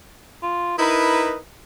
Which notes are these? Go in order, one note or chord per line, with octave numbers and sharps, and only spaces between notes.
F4
D#4 E4 A#4 B4